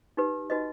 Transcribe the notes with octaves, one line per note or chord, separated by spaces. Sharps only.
D#4 G4 B4
D#4 F#4 B4 D#5